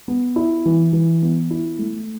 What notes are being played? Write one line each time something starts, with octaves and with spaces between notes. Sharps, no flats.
B3
E4
E3
E3
B3
E4
A3